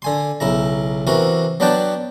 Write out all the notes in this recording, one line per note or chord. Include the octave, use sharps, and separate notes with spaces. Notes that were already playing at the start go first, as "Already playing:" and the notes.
D3 G#5 C6
B1 C#3 E4 A#5
C3 E3 F#4 A#4
F#3 B3 D4 F#5 G5 A5